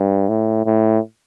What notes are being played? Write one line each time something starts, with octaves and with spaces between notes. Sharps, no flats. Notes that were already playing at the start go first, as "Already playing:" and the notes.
Already playing: G2
A2
A2